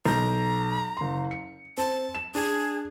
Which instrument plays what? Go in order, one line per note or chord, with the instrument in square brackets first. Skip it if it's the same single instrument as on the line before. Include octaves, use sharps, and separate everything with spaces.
[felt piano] B1 G6 [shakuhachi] A#5
[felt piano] F#1 C6
C#7
[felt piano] C4 [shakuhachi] A5
[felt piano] E7
[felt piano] D4 [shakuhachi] G#4